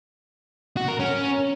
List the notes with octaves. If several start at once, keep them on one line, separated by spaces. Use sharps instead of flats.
F#4
A#4
C#4